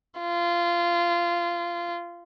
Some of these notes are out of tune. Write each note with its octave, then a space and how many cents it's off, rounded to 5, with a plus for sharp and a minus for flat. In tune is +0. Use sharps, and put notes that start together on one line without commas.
F4 -20